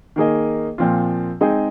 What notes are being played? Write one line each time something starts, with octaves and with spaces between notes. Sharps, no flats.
D#3 A#3 G#4 D#5
A#2 F3 C4 F4
G#3 C4 D#4 G#4 D#5